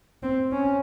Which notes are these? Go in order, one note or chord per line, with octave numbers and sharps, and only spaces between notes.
C4
C#4